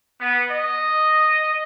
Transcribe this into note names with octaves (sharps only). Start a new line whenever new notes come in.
B3
D#5